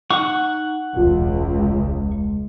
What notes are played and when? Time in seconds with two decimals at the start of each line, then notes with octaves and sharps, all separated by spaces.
0.10 D#4 F#5 C#6
0.96 E1 C#2 F4
1.71 G#3